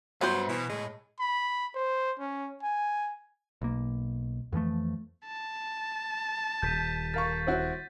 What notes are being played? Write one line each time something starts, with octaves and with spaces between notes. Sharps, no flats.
G2 F#3 B3 B4 C5 E5
B2 E3
A2 G#3
B5
C5
C#4
G#5
B1 A#3
F2 E3 F3 A3
A5
D#1 G6 B6 D#7
A#4 F5 C#6 A6
C4 E4 F#4